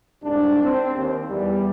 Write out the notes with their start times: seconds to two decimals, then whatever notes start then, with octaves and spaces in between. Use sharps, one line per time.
0.23 C2 G#2 D4
0.63 C4
0.96 D#2
1.29 E2 G3